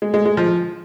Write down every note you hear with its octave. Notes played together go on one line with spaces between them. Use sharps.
G#3
G#3
G#3
F3